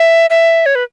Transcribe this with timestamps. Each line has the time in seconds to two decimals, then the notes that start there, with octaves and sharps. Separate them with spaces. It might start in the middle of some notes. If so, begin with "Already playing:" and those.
Already playing: E5
0.30 E5
0.66 C#5
0.75 B4